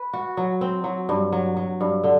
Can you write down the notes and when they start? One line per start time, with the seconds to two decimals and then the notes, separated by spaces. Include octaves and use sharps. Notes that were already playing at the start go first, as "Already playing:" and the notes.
Already playing: B4
0.13 F#4
0.37 F#3
0.61 C4
0.84 F#3
1.09 G2
1.33 F#3
1.57 F#3
1.81 G2
2.04 D3